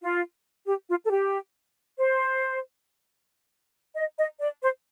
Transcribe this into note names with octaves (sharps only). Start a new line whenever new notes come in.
F4
G4
F4
A4
G4
C5
D#5
D#5
D5
C5